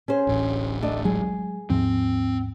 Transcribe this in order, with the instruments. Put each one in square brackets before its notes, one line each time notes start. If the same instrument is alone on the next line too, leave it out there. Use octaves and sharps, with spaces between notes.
[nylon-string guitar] C#4 G#4 C5
[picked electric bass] D1 A1
[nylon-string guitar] A3 D4 D#5
[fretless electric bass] F#3 G#3 [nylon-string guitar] G#4
[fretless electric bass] D#2 G#2 F3 [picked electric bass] C4